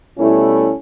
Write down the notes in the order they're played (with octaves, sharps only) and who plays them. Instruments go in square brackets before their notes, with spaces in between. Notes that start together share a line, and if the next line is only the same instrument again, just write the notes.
[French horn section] B2 G3 A3 C#4 E4